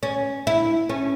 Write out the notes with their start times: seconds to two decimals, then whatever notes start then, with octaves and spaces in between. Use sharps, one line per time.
0.03 C#4
0.47 E4
0.90 C#4